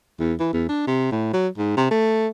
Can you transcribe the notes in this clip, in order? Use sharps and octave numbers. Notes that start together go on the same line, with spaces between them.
E2
E3
E2
D4
C3
A2
F#3
G#2
C3
A3